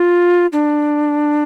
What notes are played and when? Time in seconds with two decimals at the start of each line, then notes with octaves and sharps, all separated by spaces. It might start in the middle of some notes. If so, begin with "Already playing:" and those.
Already playing: F4
0.52 D4